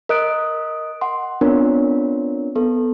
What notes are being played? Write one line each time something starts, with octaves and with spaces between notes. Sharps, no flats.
A#4 D#5 D#6 F#6 D7
F#5 C6
B3 C4 D4 F4 A#4 C#5
B3 A4